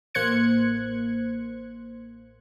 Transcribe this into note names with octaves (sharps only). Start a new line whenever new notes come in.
A1 A#3 C5 F#6 G#6 C#7